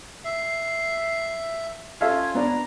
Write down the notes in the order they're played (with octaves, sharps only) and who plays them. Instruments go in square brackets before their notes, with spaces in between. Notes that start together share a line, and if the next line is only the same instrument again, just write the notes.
[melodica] E5 [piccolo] C7
[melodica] C#4 F4 [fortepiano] A4 E5 F5 [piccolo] G#6
[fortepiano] B3 D4 [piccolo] A#5